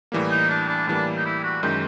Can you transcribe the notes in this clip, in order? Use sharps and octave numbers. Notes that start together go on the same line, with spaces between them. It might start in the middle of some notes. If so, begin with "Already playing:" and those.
A2 E3 G3 A#3
D#4
D4
D4
A2 E3 G3 A#3 D4
D#4
E4
F#4
F#2 D#3 G#3 G4